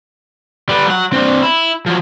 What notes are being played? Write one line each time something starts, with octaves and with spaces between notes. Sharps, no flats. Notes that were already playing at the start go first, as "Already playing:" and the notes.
G3 B3
F#3 F#5
C4 D4
E4
F3 F#3